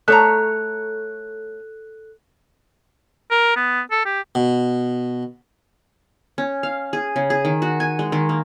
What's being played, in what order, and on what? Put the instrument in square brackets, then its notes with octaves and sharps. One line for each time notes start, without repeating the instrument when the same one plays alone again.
[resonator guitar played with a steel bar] A3 C#5 A#5 [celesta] A4 F#6
[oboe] A#4
B3
A4
G4
[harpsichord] B2
[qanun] C#4
F5
G#4
C#3
G#4
D#3
F#4
G#5
G#3
D#3
A#3